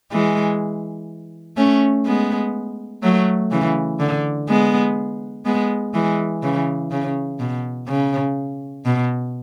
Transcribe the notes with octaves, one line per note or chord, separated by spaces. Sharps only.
E3 G#3
A3 C#4
G#3 B3
F#3 A3
C#3 E3
D3
G#3 B3
G#3 B3
E3 G#3
C#3 E3
C#3
B2
C#3
B2